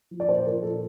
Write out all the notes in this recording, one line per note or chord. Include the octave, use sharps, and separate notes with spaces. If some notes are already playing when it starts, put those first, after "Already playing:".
F3
D5
A#2 C5
F3 A#4
A#2 A4